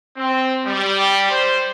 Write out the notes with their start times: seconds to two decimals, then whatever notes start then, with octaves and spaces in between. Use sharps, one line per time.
0.17 C4
0.66 G3
1.29 C5